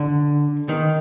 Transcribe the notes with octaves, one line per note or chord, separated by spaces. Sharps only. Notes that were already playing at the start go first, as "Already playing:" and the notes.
Already playing: D3
D#3